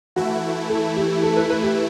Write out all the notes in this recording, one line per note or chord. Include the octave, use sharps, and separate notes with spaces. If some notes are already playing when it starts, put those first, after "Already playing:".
E3 A3 E4 F#4
A4
G4
A4
B4
B4
G4